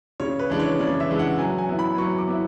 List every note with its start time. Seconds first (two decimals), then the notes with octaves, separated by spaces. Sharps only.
0.20 C#3 C#5
0.39 B4
0.50 E3 G#3 D4
0.60 C#5
0.79 C#3 D5
1.00 E5
1.09 E3 G#3 D4
1.19 F#5
1.38 F#3 G#5
1.58 G#5
1.69 B3 E4
1.79 B5
1.98 F#3 C#6
2.18 D6
2.28 B3 E4